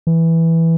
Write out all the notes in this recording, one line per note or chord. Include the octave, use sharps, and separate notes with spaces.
E3